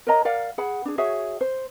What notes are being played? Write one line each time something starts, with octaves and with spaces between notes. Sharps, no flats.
A#4 C#5 D#5 A#5
A#4 D5 F5 F#5
G#4 F#5 B5
D4 G#4
F#4 G#4 C#5 E5
C5